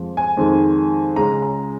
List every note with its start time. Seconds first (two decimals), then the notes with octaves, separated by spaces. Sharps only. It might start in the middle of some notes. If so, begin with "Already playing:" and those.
Already playing: F2 F3 G#3
0.17 G#5
0.37 F2 D#3 G#3
1.16 C#2 C#3 G#3 A#5
1.42 A#5